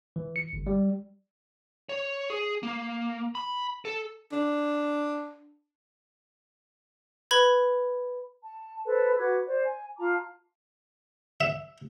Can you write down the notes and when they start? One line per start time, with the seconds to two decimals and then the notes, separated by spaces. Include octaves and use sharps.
0.16 E3
0.36 C#7
0.53 G1
0.67 G3
1.89 C#5
2.30 G#4
2.63 A#3
3.35 B5
3.85 A4
4.32 D4
7.31 B4 B5 G#6
8.43 A5
8.86 A4 B4 C5
9.18 F#4 B4 D6 G#6
9.47 C5 D5
9.64 G#5
9.98 F4 A5 A#5 D6
11.41 E5